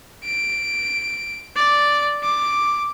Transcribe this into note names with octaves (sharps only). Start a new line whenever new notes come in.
D7
D5
D6